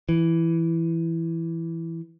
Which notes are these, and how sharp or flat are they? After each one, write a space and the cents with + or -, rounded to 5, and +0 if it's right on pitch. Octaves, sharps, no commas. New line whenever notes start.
E3 +5